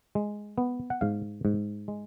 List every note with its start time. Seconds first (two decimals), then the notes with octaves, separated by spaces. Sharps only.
0.15 G#3
0.58 B3
0.90 F#5
1.01 G#2 F5
1.45 G#2
1.88 G#3